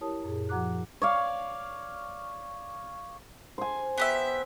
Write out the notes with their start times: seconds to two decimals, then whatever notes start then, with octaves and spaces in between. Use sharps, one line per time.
0.01 E4 G4 A#4 C#5 A5 D#6
0.24 F#2 A#2 G#4
0.49 F3 F#4 F#5 A#5 D6 F#6
1.02 C#5 D5 F5
3.58 C5 G#5
3.98 B3 G4 E5